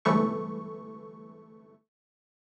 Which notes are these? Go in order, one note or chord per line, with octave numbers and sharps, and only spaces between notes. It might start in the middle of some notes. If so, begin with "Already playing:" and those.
G1 C2 G#2 E3 A3 C#6